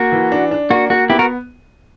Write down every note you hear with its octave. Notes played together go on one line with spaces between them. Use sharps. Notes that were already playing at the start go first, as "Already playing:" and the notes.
Already playing: A#3 F#4
E3
D4
D4
A#3 F#4
A#3 F#4
B3 E4 G4
F#4 A#4